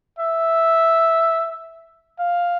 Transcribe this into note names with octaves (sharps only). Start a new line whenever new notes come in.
E5
F5